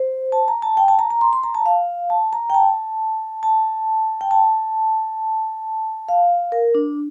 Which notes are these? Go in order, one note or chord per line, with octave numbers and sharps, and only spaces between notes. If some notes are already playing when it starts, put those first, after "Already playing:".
Already playing: C5
A5
A#5
A5
G5
A5
A#5
A#5
C6
C6
A#5
A5
F5
A5
A#5
G5
A5
A5
G5
A5
F5
A#4
D4